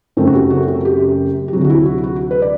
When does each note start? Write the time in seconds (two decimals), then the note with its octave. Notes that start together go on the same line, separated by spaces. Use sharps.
0.17 F#1 F#2 F#3 A3 C4 A4
0.27 F#4
0.34 G4
0.50 F#4
0.68 F#4
0.85 G4
1.48 G4
1.53 D2 C3 F#3 F#4
1.64 F#4
1.70 E4
1.86 F#4
2.04 F#4
2.31 B4
2.42 D5